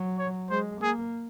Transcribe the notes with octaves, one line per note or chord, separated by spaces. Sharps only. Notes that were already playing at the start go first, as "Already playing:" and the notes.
Already playing: F#3
C#5
G#3 C5
A#3 G#4